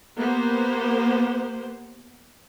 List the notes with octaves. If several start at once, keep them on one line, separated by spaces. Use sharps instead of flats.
A#3 B3 G4 C5